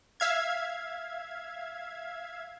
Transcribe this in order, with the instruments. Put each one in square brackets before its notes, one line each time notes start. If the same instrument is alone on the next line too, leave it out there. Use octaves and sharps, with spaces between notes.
[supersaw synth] E5 F5 G#6